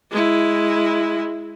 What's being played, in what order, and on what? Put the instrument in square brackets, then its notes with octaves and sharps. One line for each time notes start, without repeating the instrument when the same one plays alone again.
[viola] G#3 E4